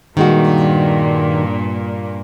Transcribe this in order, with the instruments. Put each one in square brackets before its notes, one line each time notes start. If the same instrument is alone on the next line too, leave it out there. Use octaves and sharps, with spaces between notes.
[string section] G2 A#2 A#3 [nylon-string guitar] D#3 G#3 F#4